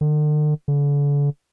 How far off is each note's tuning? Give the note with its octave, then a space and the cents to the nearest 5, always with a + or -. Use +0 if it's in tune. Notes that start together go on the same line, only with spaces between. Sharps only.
D3 +45
D3 -40